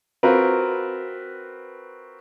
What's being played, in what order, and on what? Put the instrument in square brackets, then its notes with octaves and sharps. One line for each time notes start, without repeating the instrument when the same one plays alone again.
[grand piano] C4 F4 F#4 A#4 B4